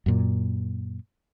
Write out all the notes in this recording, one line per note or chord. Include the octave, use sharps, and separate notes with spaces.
F#2 A#2